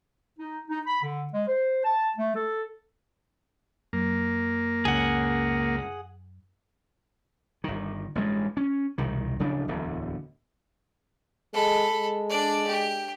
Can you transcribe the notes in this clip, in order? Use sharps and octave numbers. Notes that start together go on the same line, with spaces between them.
D#4
D#4
B5
D3
G#3
C5
A5
A3
A4
F#2 A#3
C#2 G#4 F#5
G1 D#3
A1 G2 G#3
C#4
E1 C2 D#3
D1 C#3 F3 D4
D1 E2 D3
G#3 A4 B5
G#3
D4 D5
G4